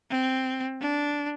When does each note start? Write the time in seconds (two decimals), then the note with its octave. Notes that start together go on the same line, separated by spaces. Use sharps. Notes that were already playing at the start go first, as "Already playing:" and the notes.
0.10 C4
0.81 D4